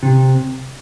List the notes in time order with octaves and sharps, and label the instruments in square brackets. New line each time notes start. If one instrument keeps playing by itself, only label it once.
[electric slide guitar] C3